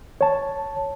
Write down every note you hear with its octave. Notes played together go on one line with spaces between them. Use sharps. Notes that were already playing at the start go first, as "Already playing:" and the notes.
C#5 A5